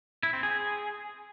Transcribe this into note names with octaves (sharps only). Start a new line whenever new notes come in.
E4
C4
G#4